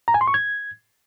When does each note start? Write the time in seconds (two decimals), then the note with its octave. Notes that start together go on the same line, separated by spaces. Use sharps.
0.08 A#5
0.14 G#5
0.21 C6
0.28 C#6
0.34 G#6